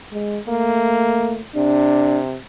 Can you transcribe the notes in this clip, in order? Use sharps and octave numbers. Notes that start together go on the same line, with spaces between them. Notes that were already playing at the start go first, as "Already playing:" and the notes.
G#3
A3 A#3
C3 D4